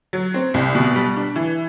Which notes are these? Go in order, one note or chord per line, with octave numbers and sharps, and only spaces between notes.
F#3
C4
C2
B2
G3
D4
E3